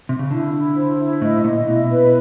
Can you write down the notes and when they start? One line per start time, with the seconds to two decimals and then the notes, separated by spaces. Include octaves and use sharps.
0.09 C3
0.19 C#3
0.31 D3 E4
0.53 E4
0.76 C5
0.99 E4
1.21 A2 D#5
1.44 A#2 D#5
1.67 B2 E4
1.91 B4